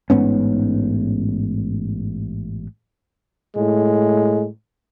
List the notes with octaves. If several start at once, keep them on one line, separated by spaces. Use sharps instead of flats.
A1 G#2 B3 C#4
A2 G#3